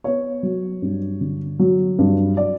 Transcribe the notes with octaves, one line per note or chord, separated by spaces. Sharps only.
B3 C#5
F#3
G2
D3
F#3
G2
D5